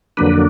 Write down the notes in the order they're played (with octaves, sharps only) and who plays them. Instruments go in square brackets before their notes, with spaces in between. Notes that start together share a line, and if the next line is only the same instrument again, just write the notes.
[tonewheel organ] F2 D3 F#3 A#3 D4 B4